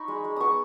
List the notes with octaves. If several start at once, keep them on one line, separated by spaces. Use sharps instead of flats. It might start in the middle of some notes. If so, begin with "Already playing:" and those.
Already playing: D#4 B5 C#6
G#3
G#3
B3 C#6 D#6